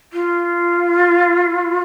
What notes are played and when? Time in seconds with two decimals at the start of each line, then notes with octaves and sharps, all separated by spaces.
0.12 F4